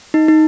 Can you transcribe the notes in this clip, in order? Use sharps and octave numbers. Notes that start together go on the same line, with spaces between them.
D#4
D#4